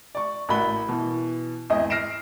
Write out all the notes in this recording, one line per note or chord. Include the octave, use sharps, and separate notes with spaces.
D5 C#6
A1 A#3 F#4 B5 G7
B2 E3
G#1 E2 D#5
F6 A#6 C7 D7 E7